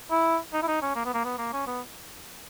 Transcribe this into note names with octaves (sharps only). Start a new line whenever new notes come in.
E4
D#4
E4
D#4
C#4
A#3
B3
A#3
B3
A#3
C#4
B3